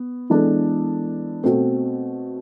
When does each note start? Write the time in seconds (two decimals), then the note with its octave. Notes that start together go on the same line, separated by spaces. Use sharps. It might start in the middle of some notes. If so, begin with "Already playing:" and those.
Already playing: B3
0.30 E3 G#3 B3 D4 A4
1.44 B2 A3 C4